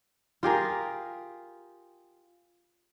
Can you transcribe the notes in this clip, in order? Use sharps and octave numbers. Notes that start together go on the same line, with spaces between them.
F4 G4 G#4 A#4